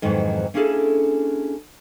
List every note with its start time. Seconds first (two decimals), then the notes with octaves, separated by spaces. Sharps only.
0.02 F2 G#2 D#3 E3 F#3
0.54 A#3 C#4 D4 E4 G#4 A4